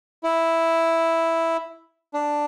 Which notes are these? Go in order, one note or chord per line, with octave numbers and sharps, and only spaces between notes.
E4
D4